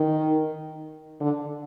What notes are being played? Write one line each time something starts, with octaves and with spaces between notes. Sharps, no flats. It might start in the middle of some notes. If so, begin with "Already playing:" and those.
Already playing: D#3
D3